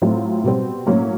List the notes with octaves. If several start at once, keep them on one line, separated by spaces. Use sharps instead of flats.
A2 F#3 A3 C4 F4
B2 G3 C4
A2 F#3 A#3 C#4